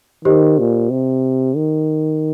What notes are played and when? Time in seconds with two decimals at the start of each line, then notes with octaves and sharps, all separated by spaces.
0.25 D#3 G4 C5 D#5
0.59 A#2
0.90 C3
1.56 D#3